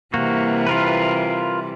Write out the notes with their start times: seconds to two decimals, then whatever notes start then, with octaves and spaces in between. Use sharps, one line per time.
0.14 C3 E3 G3 A#3 F#4
0.67 F4 A#4 B4